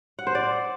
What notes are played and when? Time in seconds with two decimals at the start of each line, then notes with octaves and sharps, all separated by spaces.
0.19 F#5
0.27 C5
0.35 D5